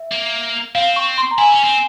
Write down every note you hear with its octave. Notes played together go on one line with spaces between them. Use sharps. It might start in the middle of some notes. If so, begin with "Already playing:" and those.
Already playing: E5
A#3
C4 F5
C#6
C6
A#5
E4 G#5
C#4
C4